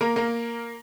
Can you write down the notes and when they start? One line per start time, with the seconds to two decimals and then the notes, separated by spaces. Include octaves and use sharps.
0.01 A#3 A#4
0.16 A#3 A#4